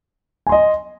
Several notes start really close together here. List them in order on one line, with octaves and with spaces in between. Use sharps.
G#5 C6 D#5